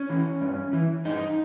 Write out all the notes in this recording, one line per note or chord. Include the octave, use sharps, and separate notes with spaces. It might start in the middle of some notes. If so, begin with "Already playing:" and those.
Already playing: C#4
E3
G2
E3
G2 D#4